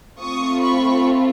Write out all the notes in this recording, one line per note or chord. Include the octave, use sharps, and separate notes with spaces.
A3 C4 F4 C#6 D#6
B5 C#6